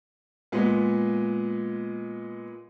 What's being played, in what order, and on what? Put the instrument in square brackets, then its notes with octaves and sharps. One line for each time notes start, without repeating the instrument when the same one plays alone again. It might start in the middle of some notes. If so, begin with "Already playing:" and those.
[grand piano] A#2 G#3 B3